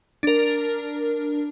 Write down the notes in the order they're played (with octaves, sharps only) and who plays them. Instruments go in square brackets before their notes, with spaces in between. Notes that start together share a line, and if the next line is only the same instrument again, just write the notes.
[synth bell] D4 A#4